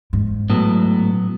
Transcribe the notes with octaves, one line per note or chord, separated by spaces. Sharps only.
G#2
A2 F#3 B3